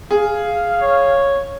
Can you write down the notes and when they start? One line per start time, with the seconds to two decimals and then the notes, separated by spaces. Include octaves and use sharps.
0.11 G#4 F5
0.82 C#5